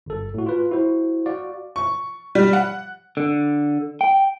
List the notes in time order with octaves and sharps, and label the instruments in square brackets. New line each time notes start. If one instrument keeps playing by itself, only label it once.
[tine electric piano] G1 A4
A2 F#4
F4 B4
E4 F#4 C5
F#4 D5 F5
[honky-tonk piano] C#6
G3
F#5
[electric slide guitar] D3
G5